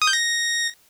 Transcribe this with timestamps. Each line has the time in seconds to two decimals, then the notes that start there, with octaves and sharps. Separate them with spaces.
0.02 D#6
0.07 G6
0.13 A#6